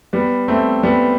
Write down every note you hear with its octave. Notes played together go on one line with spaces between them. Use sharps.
G3 B3
A3 C4
G3 B3